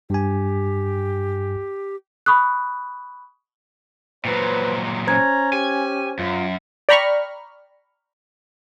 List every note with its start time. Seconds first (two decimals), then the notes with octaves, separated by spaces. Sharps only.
0.10 G2 G4 G#5
2.26 B5 C#6 D#6 F#6
4.25 A#2 F#3 B4 C5
5.07 C#4 C5 A#5 G#6
5.53 G4 G#5
6.19 F#2 F4
6.89 D5 G5 A#5 B5 C#6 F6